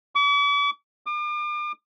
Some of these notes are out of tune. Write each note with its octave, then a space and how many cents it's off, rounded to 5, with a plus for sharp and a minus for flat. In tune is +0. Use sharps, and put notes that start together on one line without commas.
D6 -45
D6 +40